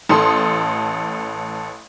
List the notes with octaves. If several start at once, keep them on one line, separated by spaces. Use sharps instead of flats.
A1 A4 C6 D#6